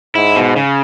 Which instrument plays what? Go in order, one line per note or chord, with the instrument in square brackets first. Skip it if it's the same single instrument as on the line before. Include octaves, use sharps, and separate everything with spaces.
[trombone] G#2 [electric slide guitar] E4
[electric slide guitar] B2
C#3